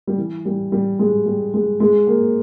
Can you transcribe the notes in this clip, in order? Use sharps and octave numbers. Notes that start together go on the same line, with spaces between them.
G3
E3
G3
G3
G#3
G3
G#3
G#3
A#3